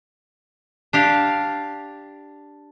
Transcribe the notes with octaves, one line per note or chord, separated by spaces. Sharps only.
D4 G4 F5